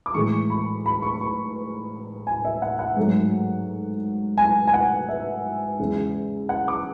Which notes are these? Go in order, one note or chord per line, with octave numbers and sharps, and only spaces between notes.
D6
A2 E3 G#3 C#6
B5
B5
C#6
C#6
G#5
E5
F#5
F#5
G#2 F#3 A3
G#5
G#5
F#5
E5
E2 C#3 G#3
F#5
D6